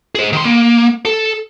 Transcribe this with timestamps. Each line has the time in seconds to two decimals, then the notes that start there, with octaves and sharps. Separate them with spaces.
0.15 G#4 C5
0.33 D#3 C6
0.45 A#3
1.05 A4